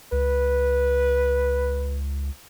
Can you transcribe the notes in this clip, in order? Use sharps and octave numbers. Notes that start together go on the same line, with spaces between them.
C#2 B4